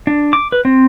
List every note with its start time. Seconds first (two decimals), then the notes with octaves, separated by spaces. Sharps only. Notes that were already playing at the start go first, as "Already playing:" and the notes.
0.07 D4
0.33 D6
0.52 B4
0.65 C4